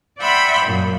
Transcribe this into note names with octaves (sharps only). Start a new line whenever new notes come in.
D5 E5 F#5 G5 B5 C6
F#2 A#2